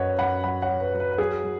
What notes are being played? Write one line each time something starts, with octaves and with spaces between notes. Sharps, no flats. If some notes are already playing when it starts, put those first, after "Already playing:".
Already playing: F#2 F#3 B4 C#5 D#5 F#5
F#3 F#5 B5
F#3 F#5 B5
C#5 F#5
F#3
B4
F#3
B4
B4
F#3 G#4
F#3